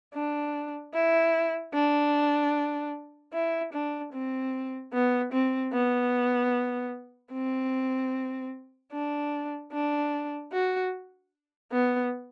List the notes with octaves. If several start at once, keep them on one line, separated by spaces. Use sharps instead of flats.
D4
E4
D4
E4
D4
C4
B3
C4
B3
C4
D4
D4
F#4
B3